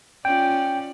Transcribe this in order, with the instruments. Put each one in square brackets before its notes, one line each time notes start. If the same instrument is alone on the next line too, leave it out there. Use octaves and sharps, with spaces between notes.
[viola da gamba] C#4 F4 D5 [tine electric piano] G5